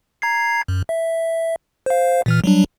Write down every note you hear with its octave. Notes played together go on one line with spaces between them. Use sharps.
A#5 G#6 C7
F#2
E5
C5 F5
A#2 E3 F6
F#3 G3 D4